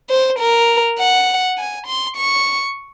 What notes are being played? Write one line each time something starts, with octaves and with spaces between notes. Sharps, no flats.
C5
A#4
F#5
G#5
C6
C#6